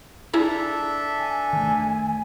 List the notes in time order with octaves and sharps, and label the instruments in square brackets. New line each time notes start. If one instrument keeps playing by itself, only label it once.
[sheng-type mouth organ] D4 A4 E5 [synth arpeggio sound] E4 G#4 A#5
[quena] G#5
[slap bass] D#3 A3